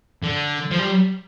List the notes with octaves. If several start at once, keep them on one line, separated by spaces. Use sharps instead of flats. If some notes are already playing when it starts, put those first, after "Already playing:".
D3
F3
G3